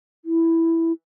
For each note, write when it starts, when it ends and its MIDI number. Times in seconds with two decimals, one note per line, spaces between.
0.25 0.92 64